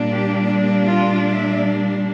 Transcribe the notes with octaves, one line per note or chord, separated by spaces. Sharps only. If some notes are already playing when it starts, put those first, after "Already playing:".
Already playing: A#2 G3 A#3 D4
G4
F4
E5